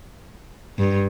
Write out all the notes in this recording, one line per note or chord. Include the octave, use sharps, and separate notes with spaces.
G2